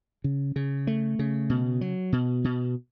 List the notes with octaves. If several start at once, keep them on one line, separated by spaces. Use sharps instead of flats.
C#3
C#3
A3
C#3
B2
F#3
B2
B2